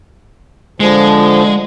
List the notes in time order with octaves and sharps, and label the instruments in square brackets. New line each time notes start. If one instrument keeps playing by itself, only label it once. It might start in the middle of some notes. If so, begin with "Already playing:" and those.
[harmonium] D3 F3 [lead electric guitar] G#3